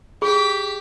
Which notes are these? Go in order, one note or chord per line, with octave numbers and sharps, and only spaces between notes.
G4 G#4 B6